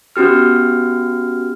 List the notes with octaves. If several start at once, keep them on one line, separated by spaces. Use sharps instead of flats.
B3 C#4 F#4 G4 F6